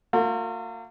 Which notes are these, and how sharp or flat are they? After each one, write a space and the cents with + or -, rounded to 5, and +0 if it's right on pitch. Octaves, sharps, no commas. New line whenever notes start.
A#3 -40 F4 +45